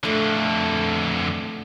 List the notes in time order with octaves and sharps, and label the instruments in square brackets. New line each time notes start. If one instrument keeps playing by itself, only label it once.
[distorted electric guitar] F2 D3 [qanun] A3 D4